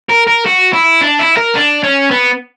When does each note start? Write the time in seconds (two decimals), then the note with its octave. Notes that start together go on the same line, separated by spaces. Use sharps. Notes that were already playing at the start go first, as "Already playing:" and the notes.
0.09 A#4
0.27 A#4
0.46 F#4
0.73 E4
1.01 D4
1.19 E4
1.37 A#4
1.55 D4
1.84 C#4
2.11 B3